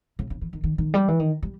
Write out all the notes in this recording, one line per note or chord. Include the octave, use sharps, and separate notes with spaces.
C#3
C#3
E3
D#3
D#3
D#3
G3
E3
D#3
G3